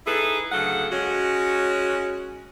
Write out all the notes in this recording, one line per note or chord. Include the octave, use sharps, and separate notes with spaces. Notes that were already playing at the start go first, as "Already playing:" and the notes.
D#4 E4 G#4 A4 B4
D2 C#3 F#3 A4 F#5
G#3 C#4 F#4